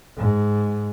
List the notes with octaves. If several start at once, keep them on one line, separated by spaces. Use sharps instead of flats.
G#2